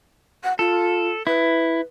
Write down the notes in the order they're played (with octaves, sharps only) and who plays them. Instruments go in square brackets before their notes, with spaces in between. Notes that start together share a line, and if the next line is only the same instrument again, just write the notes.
[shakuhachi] F#5
[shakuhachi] F4 [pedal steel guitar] A4
[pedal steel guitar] E4 [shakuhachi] B4